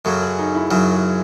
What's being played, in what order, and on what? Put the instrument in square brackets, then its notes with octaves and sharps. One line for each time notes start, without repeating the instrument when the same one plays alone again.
[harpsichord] F#2 C#3 F#3 [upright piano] A4
[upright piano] G#4
D#4
E4
[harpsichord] F#2 C#3 F#3 [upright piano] F#4
[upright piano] G#4